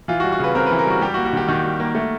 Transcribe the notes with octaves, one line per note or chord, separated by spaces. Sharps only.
E3 F4
F#4
G3
F#4
C#3 B4
C4 A#4
B4
E3
A#4
G3 F#4
G3 G4
F#4
A#3
F#4
D#3 G4
D#3 F#4
G3
A#3
A3